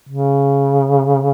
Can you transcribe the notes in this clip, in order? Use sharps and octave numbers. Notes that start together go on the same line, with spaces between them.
C#3